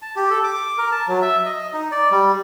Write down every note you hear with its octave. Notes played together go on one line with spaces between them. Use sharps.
A5
G4
A4
D6
A#4
A5
F#3
E5
D#5
D#4
D5
G3